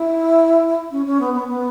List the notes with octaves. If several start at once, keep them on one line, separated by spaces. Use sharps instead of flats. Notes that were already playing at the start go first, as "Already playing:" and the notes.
Already playing: E4
C#4
C#4
B3
B3
B3